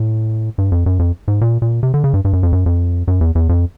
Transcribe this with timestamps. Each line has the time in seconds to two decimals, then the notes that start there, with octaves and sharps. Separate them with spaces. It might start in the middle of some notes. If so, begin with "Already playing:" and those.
Already playing: A2
0.58 G2
0.72 F2
0.86 F#2
0.99 F2
1.28 G#2
1.41 A#2
1.62 A#2
1.83 C3
1.94 D3
2.04 C#3
2.14 G2
2.25 G2
2.33 F#2
2.43 F2
2.52 F#2
2.66 F2
3.08 F#2
3.21 E2
3.35 E2
3.49 F2